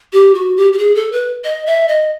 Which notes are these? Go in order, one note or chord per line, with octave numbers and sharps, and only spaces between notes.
G4
F#4
G4
G4
G#4
A4
B4
D#5
E5
D#5